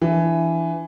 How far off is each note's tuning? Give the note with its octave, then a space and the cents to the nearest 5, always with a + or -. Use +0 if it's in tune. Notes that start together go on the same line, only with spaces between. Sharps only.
E3 +15 D4 +0